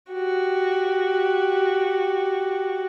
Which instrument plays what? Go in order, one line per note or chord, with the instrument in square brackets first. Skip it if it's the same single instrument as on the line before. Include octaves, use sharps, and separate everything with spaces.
[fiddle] F#4 G4